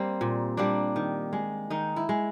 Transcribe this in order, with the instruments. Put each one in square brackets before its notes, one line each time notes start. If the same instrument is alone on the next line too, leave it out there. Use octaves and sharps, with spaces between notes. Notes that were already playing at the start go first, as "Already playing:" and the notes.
Already playing: [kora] G3 A#3 C4
A#2
G3 A#3 D4
D#3
G#3
D#3 D#4
E4
G#3